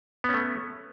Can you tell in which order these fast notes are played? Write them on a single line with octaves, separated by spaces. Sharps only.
B3 C#4 A3